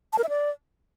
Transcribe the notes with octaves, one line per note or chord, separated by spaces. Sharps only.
A5
A#4
E5
D5